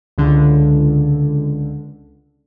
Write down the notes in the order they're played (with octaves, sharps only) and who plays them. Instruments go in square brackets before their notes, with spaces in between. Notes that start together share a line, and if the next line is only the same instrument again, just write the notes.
[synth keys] C#2 D3